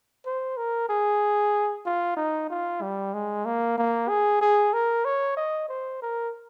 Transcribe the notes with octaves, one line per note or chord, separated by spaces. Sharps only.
C5
A#4
G#4
F4
D#4
F4
G3
G#3
A#3
A#3
G#4
G#4
A#4
C#5
D#5
C5
A#4